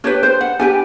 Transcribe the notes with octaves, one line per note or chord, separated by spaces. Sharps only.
D4 G4 B4 C#5
C5
F#5
D4 G4 B4 G#5